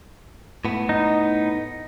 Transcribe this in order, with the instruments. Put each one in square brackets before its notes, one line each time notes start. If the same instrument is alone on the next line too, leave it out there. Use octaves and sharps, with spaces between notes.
[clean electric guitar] A2 B3
[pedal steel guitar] D#4